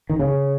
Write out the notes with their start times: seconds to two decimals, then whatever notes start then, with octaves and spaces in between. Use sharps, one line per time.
0.10 D#3
0.19 C#3